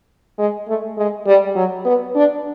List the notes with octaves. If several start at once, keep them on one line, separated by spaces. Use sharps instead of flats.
G#3
A3
G#3
G3
F#3
B3
D4